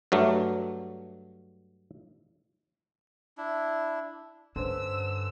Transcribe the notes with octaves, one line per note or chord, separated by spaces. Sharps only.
G2 F#3 A3
D4 E4
G2 D3 C#4 B4 C5 C6 E6